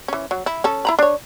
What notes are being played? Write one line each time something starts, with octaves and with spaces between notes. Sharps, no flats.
E3 C#4
F#3
E4
C#4 A4
E4 A#5 B5
D4 C#5